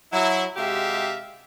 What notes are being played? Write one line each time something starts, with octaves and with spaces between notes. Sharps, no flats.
F#3 E4
C3 G#3 F#4 G4 E5 F5